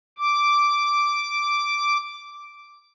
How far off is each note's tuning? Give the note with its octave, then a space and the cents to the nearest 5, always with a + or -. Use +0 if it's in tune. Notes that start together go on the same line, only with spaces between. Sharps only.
D6 -5